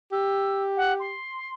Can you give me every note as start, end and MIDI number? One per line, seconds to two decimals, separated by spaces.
0.12 1.14 67
0.12 0.62 88
0.76 0.93 78
0.99 1.53 84